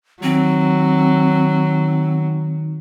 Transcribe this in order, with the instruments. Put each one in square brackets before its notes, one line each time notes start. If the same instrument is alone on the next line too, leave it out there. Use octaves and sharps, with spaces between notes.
[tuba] D#3 [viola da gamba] F#3 [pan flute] C4